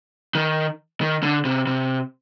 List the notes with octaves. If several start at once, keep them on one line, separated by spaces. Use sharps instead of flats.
D#3
D#3
D3
C3
C3